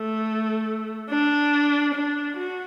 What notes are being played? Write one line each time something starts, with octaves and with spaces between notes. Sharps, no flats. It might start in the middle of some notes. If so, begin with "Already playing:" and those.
Already playing: A3
D4
D4
F#4